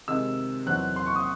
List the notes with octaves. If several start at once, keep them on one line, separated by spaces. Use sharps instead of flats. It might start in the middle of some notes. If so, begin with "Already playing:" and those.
C3 D#3 G#3 E6
E2 D#3 F#3 C4 F#6
C6
C#6
D#6